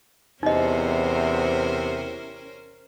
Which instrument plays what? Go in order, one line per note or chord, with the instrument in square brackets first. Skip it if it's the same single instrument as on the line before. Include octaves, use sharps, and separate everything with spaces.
[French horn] E2 [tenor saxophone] C3 [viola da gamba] C#4 A#4 C5 [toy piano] D#4 D#5